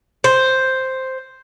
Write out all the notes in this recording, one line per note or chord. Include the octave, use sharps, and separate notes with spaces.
C5